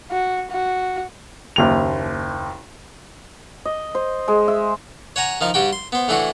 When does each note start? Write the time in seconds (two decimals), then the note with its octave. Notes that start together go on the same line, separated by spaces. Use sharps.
0.10 F#4
0.51 F#4
1.56 F#1 D#2 F7
3.65 D#5
3.95 C5
4.28 G#3
4.48 E5
5.16 C#5 F#5 G#5 A#5
5.41 D#3 F3 D#4
5.54 G2 G3 F#4 G5
5.73 C6
5.92 B3 C5
6.08 A2 E3 A3 D4 F#4